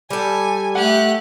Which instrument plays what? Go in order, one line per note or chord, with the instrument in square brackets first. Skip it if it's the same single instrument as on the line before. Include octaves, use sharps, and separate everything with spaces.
[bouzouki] G3 A4 [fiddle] G#5
[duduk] A3 [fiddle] G4 F#6 [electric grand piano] F#5